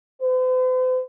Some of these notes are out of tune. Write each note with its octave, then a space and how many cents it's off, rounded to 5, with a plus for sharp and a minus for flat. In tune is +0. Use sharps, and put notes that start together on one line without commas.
C5 -45